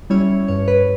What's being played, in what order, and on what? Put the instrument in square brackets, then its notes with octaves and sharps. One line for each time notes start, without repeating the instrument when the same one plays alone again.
[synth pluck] G3 C#4 E4 C#5
G2 C#5
B4